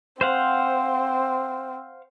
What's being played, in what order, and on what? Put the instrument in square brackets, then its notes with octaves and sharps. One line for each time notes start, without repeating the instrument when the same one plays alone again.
[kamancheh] C4 [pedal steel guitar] C5 F5 F#5